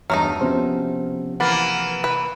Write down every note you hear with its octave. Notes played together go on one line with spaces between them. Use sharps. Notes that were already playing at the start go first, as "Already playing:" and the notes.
E2 G2 F#3 A3 D#4 F6
C3 F3 B3 C#4 C5
E3 A#3 F#5 B5 A6
B4